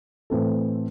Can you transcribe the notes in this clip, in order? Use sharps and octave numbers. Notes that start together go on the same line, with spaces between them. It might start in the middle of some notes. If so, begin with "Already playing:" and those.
A2 E3 C4 A4